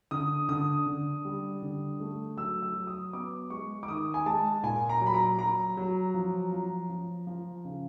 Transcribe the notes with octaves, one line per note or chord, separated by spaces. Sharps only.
D3 D#6
D3 D#6
D3
G3
D3
A3
F#3 E6
E6
F#3
D#6
B3 D6
G#3 C#6
D6
D#3 D#6
G#5
G#3 A5
A#2 G#5
A#5
F#3
B5
A#5
F#3 A#5
F#3
F3
F3
F3
F3
C#3